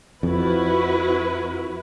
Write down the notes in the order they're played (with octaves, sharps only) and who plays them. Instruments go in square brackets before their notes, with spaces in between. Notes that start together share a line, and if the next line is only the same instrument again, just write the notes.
[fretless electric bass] F2 [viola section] E4 F#4 B4